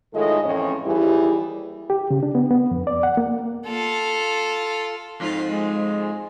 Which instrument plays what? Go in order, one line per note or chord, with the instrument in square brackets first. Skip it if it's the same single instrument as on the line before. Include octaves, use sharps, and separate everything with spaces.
[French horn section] A2 D#3 G#3 F4 A4 D#5
F2 A2 E3 C#4 C#5
D#2 E3 G3 E4 G4 G#4
[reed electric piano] G4
C#3
D4
B3
B3
F2
D5
F#5
A#3
[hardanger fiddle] F4 A4
[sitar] F2 G#2 F4
[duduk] G#3